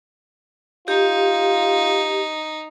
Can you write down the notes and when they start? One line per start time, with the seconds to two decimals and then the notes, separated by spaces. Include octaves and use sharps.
0.88 D#4 F4 G4